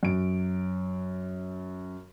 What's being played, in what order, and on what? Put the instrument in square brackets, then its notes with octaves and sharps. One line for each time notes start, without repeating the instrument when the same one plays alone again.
[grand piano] F#2 D7